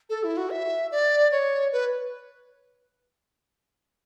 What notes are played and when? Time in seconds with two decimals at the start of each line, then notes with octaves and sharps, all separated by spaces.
0.10 A4
0.24 E4
0.37 F#4
0.50 E5
0.92 D5
1.32 C#5
1.72 B4